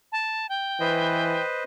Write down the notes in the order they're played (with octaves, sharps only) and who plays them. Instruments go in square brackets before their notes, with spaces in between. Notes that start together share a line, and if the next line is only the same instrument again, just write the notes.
[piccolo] A5
G5
[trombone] E3 [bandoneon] B4 C5 D#5